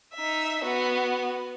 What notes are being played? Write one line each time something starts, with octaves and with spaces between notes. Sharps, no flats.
D#4 E5
B3 F#4